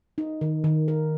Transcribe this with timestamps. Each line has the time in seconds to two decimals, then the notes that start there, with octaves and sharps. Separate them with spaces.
0.18 D#4
0.41 D#3
0.64 D#3
0.88 A#4